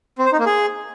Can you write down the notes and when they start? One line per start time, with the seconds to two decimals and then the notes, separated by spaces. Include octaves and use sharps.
0.18 C4
0.25 C5
0.32 D#4
0.39 A#3
0.46 G#4